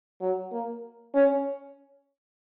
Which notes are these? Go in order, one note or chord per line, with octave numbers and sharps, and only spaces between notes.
F#3
A#3
C#4